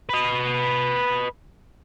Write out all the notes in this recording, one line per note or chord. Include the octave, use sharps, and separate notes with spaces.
B4 D#5